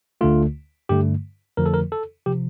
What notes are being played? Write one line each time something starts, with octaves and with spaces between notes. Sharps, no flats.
D2 D3 A3 F4
G2 D3 A3 G4
F2 D3 F3 A3 A#4
A4
A#4
A4
C3 F3 G4